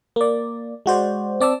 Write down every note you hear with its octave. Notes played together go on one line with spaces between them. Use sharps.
A#3 D5
G#3 F#4 C5 D5
C4 D5 A5 E6